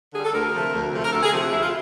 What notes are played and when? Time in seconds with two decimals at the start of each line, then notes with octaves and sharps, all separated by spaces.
0.13 D3 G3 G#4
0.25 A4
0.33 D2 A#4
0.53 C3 F3 A3
0.73 D2
0.92 C3 F3 A3
1.04 A#4
1.12 D2 A4
1.23 G#4
1.32 C3 F3 A3 G4
1.42 F#4
1.52 D2 E4
1.62 F4